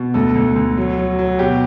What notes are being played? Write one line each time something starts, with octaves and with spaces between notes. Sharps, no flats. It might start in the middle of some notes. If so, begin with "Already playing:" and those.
Already playing: B2
D2 A4
D2
D2
F#3
F#3
F#3
B2 G4